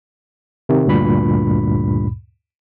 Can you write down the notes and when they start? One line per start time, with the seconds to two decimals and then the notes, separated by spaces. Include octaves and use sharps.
0.69 C3 D#3
0.86 D2 G2 A#2 B5